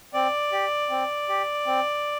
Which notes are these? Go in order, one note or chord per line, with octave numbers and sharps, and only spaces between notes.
C4 D5
G4
C4
G4
C4